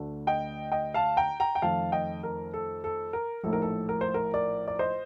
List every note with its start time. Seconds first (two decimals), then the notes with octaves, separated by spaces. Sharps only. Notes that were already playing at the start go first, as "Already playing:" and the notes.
Already playing: D2 D3 A3 D4
0.27 D#5 G5
0.72 D#5 G5
0.94 F5 A5
1.17 G5 A#5
1.40 G5 A#5
1.55 G5
1.62 F2 D#3 A3 F5 A5
1.92 D#5 G5
2.23 A#4
2.53 A4
2.84 A4
3.13 A#4
3.44 A#1 A2 A3 D#4 A4
3.53 A#4
3.62 A4
3.89 A#4
4.01 C5
4.14 A#4
4.34 A#4 D5
4.68 D5
4.79 C5 D#5